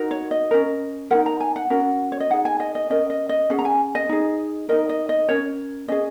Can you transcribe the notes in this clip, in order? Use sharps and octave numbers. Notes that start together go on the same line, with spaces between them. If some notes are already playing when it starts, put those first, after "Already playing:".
Already playing: D#4 F#4 A#4
C#5
D#5
C#4 A#4
D#4 F#4 A#4 F#5
A#5
G#5
F#5
C#4 F#4 A#4
C#5
D#5
D#4 G#4 F#5
G#5
D#5
D#5
C#4 A#4 D#5
D#5
D#5
C#4 G#4 F#5
A#5
G#5
D#5
D#4 G#4
D#4 F#4 A#4 D#5
D#5
D#5
C#4 A#4 C#5
C#4 G#4 D#5